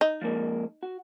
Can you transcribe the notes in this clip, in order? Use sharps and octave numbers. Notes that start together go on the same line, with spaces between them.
D#4
F3 G#3 A#3
F#4